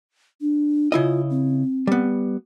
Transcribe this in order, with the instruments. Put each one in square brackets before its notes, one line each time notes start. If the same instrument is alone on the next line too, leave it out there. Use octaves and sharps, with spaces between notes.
[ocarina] D4
[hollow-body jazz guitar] C#3 E4 D#5 [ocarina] F4
[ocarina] C4
[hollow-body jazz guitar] G3 B3